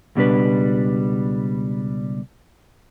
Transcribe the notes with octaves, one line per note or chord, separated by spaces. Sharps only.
C#2 B2 G3 D4 B4